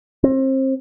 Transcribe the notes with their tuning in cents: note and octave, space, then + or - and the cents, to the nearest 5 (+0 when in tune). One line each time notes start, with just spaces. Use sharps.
C4 +30